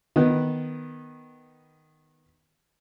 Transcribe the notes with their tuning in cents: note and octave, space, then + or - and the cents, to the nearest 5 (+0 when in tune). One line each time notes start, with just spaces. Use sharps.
D#3 +0 B3 +0 B4 +0